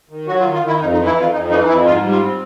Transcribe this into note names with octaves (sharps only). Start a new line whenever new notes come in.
D#3
F#3 F#4
F4
D#3
F4
D#3 E4
F2 D#4
D#4
E3
E4
F2
F4
F2 D#4
E3 D#4
F2 E4
G#2 F4
G3
F4
C4